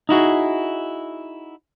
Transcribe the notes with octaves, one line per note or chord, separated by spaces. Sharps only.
D#4 E4 F#4 G#4